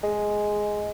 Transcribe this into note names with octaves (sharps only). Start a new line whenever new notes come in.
G#3